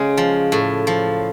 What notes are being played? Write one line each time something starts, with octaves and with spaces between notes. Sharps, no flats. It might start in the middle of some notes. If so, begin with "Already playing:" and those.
Already playing: C#3 G#3
F3
A2
F3